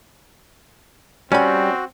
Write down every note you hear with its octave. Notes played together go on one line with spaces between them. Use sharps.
G3 C4 C#4 F#4 B5